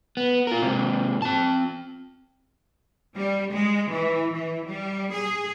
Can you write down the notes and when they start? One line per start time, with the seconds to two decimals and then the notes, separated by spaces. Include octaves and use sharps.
0.17 B3
0.47 F4 A#4
0.62 G#2 C3
1.22 C4 A5
3.16 G3
3.53 G#3
3.92 E3
4.34 E3
4.69 G3
5.14 G#4